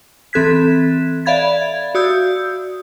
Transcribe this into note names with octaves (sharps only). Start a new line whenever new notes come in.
E3 C4 A4 F#6 G#6 B6
D5 E5 F5 B5 G#6 A6
F#4 D5 D#6 E6 G6